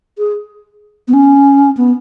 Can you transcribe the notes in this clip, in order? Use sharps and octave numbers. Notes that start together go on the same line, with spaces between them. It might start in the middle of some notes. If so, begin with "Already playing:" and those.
G#4
B3
C#4
B3